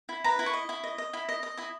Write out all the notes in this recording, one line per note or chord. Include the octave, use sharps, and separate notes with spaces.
E4
B4 A#5
E4
C#6
D#5
E4
D#5
D#5
E4
D#5
D#5
E4 D#6